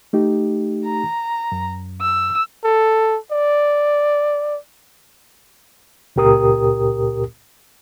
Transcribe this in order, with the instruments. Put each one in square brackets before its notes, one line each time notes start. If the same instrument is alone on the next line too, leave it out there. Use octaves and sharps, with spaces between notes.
[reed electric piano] A3 D#4 G4
[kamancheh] A#5
[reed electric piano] F#2
[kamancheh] E6
[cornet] A4
D5
[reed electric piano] C#2 A#2 G4 A#4 D#6